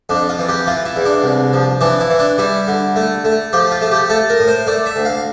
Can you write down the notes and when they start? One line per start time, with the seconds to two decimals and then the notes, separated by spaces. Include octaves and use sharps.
0.09 F2 D4
0.29 F4
0.39 E3
0.49 G4
0.67 E3 F4
0.86 E4
0.96 E2
1.05 D4
1.24 C2
1.53 F3
1.81 E3 D4
2.00 E4
2.10 E3
2.19 D4
2.38 G3 E4
2.68 D3
2.96 A3
3.25 A3
3.53 F3 G4
3.71 F4
3.81 A3
3.91 G4
4.09 A3 A4
4.30 A#4
4.39 A2
4.48 C5
4.67 A3 D5
4.86 E5
4.96 D2
5.05 F5